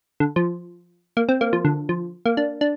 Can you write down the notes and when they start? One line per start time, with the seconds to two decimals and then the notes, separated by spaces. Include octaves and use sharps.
0.20 D3
0.36 F3
1.17 A#3
1.29 C4
1.41 A#3
1.53 F3
1.65 D3
1.89 F3
2.26 A#3
2.37 D4
2.61 D4